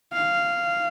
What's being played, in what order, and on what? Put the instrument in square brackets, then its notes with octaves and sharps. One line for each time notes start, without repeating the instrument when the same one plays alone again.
[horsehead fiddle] F5